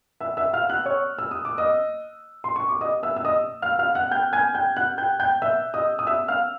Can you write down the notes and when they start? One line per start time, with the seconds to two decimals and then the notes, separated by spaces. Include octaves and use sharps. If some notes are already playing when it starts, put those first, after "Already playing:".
0.20 E5 E6
0.37 E5 E6
0.53 F5 F6
0.69 F#5 F#6
0.86 C#5 C#6
1.19 E6
1.31 D#6
1.45 D6
1.58 D#5 D#6
2.44 C6
2.56 C#6
2.69 D6
2.81 D#5 D#6
3.03 E5 E6
3.17 E6
3.25 D#5 D#6
3.62 F5 F6
3.79 F5 F6
3.95 F#5 F#6
4.11 G5 G6
4.33 G#5 G#6
4.54 G5 G6
4.76 F#5 F#6
4.98 G5 G6
5.20 G5 G6
5.42 E5 E6
5.74 D#5 D#6
5.99 D#6
6.07 E5 E6
6.28 F5 F6